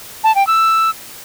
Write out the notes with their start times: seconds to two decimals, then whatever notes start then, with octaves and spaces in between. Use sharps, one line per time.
0.24 A5
0.35 G5
0.47 E6